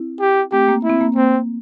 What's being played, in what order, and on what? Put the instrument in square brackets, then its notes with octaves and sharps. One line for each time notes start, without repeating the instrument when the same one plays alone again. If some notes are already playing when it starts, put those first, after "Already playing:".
Already playing: [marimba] C4 E4
[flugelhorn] G4
[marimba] A3 C4 [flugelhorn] G4
[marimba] A#3
[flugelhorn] E4
[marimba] C4
A#3
[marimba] A#3 [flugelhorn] C4